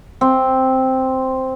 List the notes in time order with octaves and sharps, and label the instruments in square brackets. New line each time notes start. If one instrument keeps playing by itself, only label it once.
[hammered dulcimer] C4